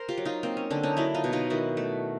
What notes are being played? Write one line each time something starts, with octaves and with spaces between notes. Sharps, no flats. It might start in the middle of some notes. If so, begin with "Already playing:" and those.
Already playing: A#4 C5
F4 G4
F#3
D#4 F4
A#3 C4
C#4
D3 C4 D4
C#4 D#4
F#3 D4 E4
D#4 F4
B2
D#4 F4
D#3 E4 F#4
A3